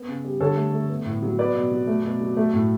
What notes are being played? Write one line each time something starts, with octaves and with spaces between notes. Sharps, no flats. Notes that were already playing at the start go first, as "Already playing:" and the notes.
Already playing: B3
C#3
G3
D3 A4 C#5
A3
A3
B3
A2
F#3
B3 B4 D5
B2
F#3
A3
B2
F#3
A3
A2